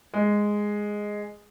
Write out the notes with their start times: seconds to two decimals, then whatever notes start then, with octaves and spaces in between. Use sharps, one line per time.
0.14 G#3